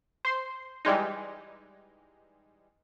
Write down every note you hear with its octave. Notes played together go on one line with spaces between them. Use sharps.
C5 C6
E3 G3 G#3 D#4